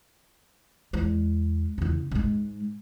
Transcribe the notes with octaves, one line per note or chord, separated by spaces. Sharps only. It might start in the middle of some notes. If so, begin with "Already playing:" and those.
E2 G#3
E2 C#3
G#2 G#3